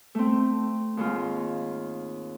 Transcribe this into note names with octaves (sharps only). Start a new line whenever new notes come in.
A3 C4
D#2 G#2 F4